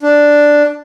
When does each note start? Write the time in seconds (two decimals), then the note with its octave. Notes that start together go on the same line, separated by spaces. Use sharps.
0.03 D4